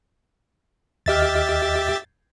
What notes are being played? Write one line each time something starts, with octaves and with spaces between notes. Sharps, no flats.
D#2 G4 D#5 E5 F6 A6